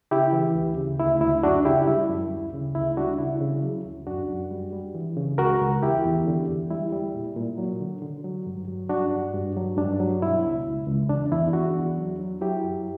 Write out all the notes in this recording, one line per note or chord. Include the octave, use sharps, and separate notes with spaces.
C#3 E4 G4
E3
D2
C#3
D2 E4
D2 E4
F#2 D4 F#4
C#3 E4 G4
G3 E4
F#2
D2
C#3
D2 E4
G3 D4 F#4
C#3 E4
C#3
F#3
D2
F#2 D4 F#4
F#2
G3
G3
E3
C#3
C#2 F#4 A#4
C#2
E2 E4 G4
E2
D3
E2
G3 E4
G3
A#2
A#2
F#3
D3
D3
F#3
G2
F#3
G2 D4 F#4
G2
G2
F#3
G2 D4
F#3
B2 E4
C#2
C#2
C#2
E2 D4
E2 E4
E2 D4 F#4
E2
F#3
F#3
F#3 E4 G4
F#2